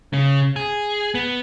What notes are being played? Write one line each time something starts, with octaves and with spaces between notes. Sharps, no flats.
C#3
G#4
B3